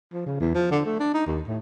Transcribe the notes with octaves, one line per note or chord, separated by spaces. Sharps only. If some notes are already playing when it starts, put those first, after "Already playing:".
F3
C#3
E2
F3
D3
A3
D4
D#4
D#2
A2